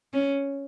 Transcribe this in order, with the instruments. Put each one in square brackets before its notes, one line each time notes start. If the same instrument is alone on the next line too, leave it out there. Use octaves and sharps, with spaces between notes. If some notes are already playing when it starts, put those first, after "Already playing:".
[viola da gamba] C#4